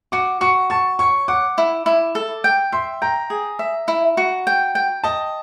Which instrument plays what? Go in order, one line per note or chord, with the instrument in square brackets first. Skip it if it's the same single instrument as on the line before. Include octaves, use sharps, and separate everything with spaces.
[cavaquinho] F#4 [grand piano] D6
[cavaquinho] F#4 [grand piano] C#6
[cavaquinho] A5 [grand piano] C#6
[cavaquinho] C#5 [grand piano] C#6
[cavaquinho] F#5 [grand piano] D6
[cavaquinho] E4
E4
A4
G5
[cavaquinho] E5 [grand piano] C6
[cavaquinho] G5 [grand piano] A#5
[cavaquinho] G#4
E5
E4
F#4
G5
G5
[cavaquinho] D#5 [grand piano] A5